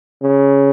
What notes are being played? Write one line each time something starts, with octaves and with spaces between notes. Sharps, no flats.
C#3